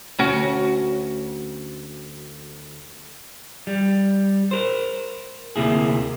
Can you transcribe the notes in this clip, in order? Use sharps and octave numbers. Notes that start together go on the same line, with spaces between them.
D2 C#4 F#4
G3
A#4 C5
D2 C3 A#3 E4 G#4